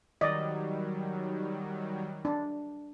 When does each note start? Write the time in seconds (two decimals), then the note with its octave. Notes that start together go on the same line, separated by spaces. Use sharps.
0.21 D#3 F#3 G3 D5 D#5
2.25 D4